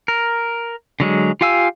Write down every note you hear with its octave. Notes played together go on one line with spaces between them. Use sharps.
A#4
D3 F#3 G#3
F4 G4 F5 G#5 E6